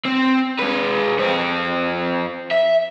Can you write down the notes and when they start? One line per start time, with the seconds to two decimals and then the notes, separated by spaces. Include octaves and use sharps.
0.06 C4
0.60 G#3 B4
1.19 F2 C4
2.51 E5